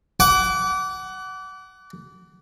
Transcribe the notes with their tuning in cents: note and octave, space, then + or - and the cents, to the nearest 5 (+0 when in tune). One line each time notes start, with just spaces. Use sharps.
F#5 +20 D6 -25